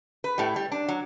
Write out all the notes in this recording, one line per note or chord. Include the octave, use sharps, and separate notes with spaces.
B4
A2 G3
G3
D4
F#3